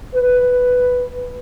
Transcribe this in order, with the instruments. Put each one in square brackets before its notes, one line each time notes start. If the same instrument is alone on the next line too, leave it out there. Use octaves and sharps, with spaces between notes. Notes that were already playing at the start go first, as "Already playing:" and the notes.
[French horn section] B4